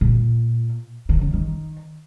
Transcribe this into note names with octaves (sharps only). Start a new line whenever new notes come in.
A#2
D#3
C#3
D#3